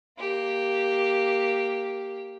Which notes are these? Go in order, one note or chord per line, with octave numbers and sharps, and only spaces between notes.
A#3 G4